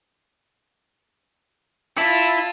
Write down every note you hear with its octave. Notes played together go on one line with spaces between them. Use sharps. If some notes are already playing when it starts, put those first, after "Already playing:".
E4 F4 A5